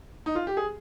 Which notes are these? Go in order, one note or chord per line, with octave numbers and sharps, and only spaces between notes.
D#4
F4
G4
G#4